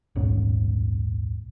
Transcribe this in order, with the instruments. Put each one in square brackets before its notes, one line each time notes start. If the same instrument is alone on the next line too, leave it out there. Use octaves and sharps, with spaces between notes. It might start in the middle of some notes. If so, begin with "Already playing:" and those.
[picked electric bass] D#1 B1 G#2 C#4